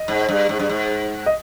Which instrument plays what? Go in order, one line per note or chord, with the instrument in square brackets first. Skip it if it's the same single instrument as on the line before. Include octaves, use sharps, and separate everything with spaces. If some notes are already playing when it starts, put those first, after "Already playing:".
Already playing: [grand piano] D#5
[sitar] G#2
G2
G#2
G2
G#2
[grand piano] D#5